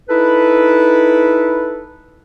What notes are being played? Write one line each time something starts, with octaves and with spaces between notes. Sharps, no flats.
D#4 E4 A4 B4